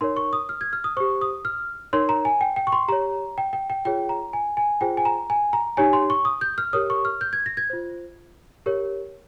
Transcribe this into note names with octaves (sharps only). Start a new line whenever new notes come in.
D#4 A#4 C#5 C6
C#6
D#6
F6
G#6
F6
D#6
G4 C5 C#6
D#6
F6
D#4 A#4 C#5 C6
A#5
G#5
G5
G5
C#6
C6
G4 C#5 A#5
G5
G5
G5
F4 G#4 C#5 G5
A#5
G#5
G#5
F4 G#4 C5 G5
G#5
A#5
G#5
A#5
D#4 G4 C#5 G#5
C6
C#6
D#6
G6
F6
G4 A#4 C#5 D#6
C#6
F6
G6
G#6
A#6
G#6
F4 C5
G4 A#4 C#5